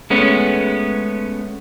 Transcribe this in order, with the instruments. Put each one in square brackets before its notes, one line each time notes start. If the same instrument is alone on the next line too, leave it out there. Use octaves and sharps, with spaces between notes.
[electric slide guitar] G#3 A3 B3 C#4